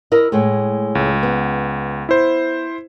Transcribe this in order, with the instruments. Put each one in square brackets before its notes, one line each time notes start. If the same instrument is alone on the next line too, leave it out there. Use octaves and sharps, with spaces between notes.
[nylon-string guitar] E4 A#4 D#5
A2 G#3 A3
[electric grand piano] C#2
[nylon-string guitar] B3
[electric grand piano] E4 C5